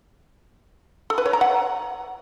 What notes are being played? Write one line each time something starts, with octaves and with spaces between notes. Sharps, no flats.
A4
B4
C#5
A#5
F#5